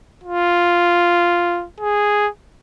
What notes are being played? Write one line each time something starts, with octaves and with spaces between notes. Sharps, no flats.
F4
G#4